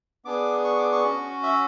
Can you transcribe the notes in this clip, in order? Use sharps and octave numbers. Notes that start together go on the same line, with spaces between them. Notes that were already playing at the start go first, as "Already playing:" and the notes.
B3 D4 G#4 D6
C#6
D6
C#6
C#4 F#4
E5